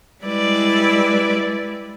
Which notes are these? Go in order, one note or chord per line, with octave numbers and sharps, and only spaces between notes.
G3 G#3 E4 B4 D5